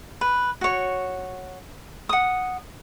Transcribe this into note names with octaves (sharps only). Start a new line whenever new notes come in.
B4
F#4 C#5
F#5 D#6